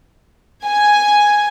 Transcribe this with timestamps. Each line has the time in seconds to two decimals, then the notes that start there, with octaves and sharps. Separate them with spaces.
0.65 G#5